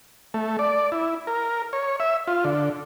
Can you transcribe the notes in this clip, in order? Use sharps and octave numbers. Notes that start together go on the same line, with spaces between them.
A3
D5
E4
A#4
C#5
E5
F4
D3